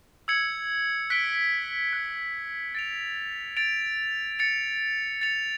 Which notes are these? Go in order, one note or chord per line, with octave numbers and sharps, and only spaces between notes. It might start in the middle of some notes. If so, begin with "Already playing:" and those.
E6 G#6 C#7 F#7
F#6 B6 D7 G7
F#6 B6 D7 G7
A6 D7 F7
A6 D7 F7
A6 C#7 F7
A6 C#7 F7